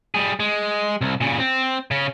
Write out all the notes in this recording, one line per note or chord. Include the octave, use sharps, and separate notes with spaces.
G3 G#4
G#3
C2
A#2 C#3
C4
C#3 C#4